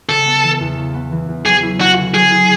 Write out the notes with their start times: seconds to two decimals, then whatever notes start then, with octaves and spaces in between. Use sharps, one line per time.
0.09 C#3 A4
0.26 B3
0.44 E3
0.61 E2
0.78 C#3
0.94 B3
1.12 E3
1.28 E2
1.45 F#3 G#4
1.63 E4
1.81 C#4 F#4
1.98 D3
2.14 F#3 G#4
2.31 E4